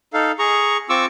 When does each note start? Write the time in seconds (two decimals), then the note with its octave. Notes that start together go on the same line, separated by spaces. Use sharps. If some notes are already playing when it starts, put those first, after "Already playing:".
0.13 D#4 A4 F5
0.39 G#4 A#5 C#6
0.89 C4 F4 C#6 D6 E6